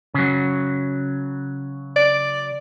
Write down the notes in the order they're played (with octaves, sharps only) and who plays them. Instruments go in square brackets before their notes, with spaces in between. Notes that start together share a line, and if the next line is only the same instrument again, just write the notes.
[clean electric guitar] C#3 F#3
[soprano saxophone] D5